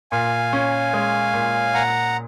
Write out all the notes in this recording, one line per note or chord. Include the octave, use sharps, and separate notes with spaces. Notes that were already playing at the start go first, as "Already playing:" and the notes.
A#2 F5 G#5
C#4
G#3
A#2
A#2 F#5 A#5